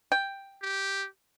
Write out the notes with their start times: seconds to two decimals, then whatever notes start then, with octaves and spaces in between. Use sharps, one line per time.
0.12 G5
0.62 G4